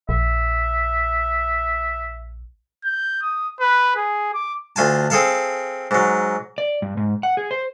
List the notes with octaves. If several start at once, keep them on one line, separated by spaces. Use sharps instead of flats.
A#1 E5
G6
D#6
B4
G#4
D6
D2 F4 G#5 A5
C4 G#4 A4 F5 A5
G#2 F#3
D5
G2
G#2
F#5
G#4
C5